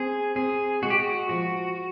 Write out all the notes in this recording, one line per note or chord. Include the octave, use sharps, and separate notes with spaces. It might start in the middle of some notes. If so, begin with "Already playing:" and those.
Already playing: C4 G#4
C4 G#4
G#3 F#4
G4
F#4
F3 F#4